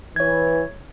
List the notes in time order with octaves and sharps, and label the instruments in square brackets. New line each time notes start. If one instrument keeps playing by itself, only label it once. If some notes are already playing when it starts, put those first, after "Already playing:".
[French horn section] E3 [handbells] C#5 G#6